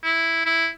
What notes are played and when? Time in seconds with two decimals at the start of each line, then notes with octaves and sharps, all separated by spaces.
0.03 E4
0.45 E4